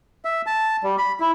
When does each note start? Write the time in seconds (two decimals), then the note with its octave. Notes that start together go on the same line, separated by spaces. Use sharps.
0.25 E5
0.46 A5
0.84 G3
0.98 B5
1.20 E4